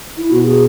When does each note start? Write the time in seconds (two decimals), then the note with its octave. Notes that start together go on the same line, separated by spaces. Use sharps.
0.18 E4
0.31 B2 F#4
0.45 G#4